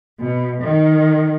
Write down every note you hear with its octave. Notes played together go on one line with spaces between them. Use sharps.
B2
D#3